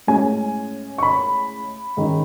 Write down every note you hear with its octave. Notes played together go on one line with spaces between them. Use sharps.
A2 G#3 C#4 G#5
C#6
B5
G#2 D#3 G#3 C#4